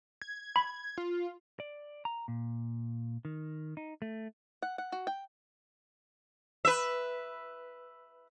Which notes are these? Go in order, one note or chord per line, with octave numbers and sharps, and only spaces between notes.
G#6
B5
F4
D5
A#5
A#2
D#3
D#4
A3
F#5
F#5
F#4
G5
B4 E5